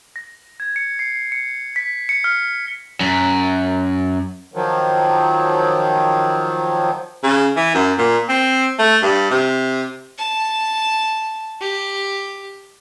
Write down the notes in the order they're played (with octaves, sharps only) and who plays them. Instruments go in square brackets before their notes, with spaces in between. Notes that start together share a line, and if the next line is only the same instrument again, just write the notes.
[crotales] A#6
G#6
C#7
C7
C#7
B6
C#7
F6
[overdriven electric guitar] F#2
[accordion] D#3 F3 F#3
[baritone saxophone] C#3
E3
F#2
A#2
C4
A3
G2
C3
[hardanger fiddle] A5
G4